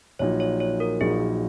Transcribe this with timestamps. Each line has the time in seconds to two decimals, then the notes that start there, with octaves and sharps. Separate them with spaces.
0.19 A#1 A#2 F#3 D#4 C#5
0.40 C#5
0.60 C#5
0.80 A#4
1.00 A#1 A#2 F#3 D#4 G#4